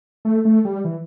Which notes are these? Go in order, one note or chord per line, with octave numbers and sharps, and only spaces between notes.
A3
A3
G3
E3